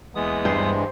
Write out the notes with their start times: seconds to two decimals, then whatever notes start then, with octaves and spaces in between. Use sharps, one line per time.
0.15 D#2 E3 G#3 B3 D#6
0.45 G2 C5